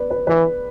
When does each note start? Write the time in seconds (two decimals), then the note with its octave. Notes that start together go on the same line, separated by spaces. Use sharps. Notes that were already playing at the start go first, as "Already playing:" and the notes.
Already playing: B4 D5
0.11 B4
0.27 E3 B4